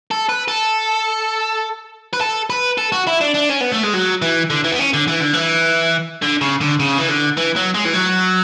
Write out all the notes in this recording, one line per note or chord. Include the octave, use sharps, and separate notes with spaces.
A4
B4
A4
B4
A4
B4
A4
F#4
E4
D4
D4
C#4
B3
A3
G#3
F#3
E3
D3
E3
B3
C#4
D3
E3
D3
E3
D3
C#3
D3
C#3
E3
D3
E3
F#3
G#3
E3
F#3